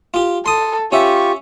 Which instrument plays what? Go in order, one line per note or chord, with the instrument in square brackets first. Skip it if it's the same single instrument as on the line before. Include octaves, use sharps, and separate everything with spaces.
[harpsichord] F4 G4
[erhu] A4 [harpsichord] C6 D#6
[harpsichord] C#4 E5 [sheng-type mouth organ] F4 G4 [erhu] C#6